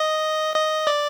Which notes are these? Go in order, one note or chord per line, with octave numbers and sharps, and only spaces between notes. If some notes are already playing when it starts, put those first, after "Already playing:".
Already playing: D#5
D#5
D5